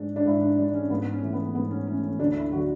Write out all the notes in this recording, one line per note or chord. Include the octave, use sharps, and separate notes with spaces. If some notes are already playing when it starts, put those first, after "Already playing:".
Already playing: G#2 G#3 D4
D4
G#2 E4
D4
G#3 D4
C#4
G#2 B3
C#4
E3 A3
B3
G#2 B3
C#4
E3 A3 C#4
C#4
D2 D4
E4
D3 F#3 F#4